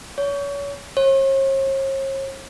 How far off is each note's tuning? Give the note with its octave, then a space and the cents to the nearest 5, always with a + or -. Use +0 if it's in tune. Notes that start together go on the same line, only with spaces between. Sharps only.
C#5 +35
C#5 -45